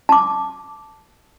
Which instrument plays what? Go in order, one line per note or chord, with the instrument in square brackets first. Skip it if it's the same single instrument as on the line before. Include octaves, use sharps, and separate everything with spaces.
[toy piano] A5 D6